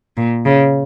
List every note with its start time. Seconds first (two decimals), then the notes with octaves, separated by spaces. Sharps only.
0.17 A#2
0.45 C#3